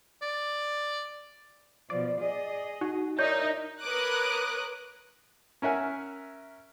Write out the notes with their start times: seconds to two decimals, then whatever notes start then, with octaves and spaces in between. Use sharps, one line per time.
0.22 D5
1.90 B2 F3 D5
2.21 G#4 D#5
2.81 D#4 F#4
3.19 D#4 A#4 C#5 D5 E5 G6
3.81 A#4 B4 C#5 D6 D#6 F#6
5.62 C#4 A#4 E5 F#5 G#5